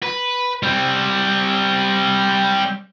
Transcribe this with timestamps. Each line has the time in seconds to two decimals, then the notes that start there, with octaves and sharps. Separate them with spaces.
0.03 B4
0.63 G3 C4